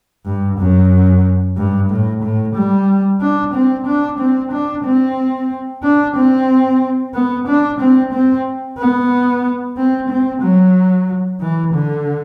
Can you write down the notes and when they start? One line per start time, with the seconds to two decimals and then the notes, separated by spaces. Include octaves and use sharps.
0.25 G2
0.59 F#2
1.57 G2
1.90 A2
2.23 A2
2.56 G3
3.21 D4
3.54 C4
3.86 D4
4.19 C4
4.52 D4
4.85 C4
5.83 D4
6.16 C4
7.14 B3
7.47 D4
7.80 C4
8.13 C4
8.78 B3
9.77 C4
10.09 C4
10.42 F#3
11.41 E3
11.74 D3